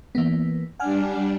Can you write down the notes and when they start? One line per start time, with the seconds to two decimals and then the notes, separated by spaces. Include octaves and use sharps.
0.15 E3 A#3 B3
0.80 G3 D4 F#5 G#5 F6